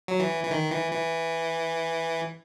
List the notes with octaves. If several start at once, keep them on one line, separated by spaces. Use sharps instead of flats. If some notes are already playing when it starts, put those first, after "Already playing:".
F#3
E3
E3
D#3
E3
E3